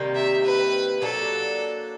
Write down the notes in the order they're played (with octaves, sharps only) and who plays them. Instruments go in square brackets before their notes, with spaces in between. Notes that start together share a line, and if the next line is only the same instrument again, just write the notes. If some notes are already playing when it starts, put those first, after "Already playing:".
Already playing: [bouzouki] C3 D#3 G3 A#3
[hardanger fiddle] E5
B4
[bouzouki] F#3 A#3 D4 [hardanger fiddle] A4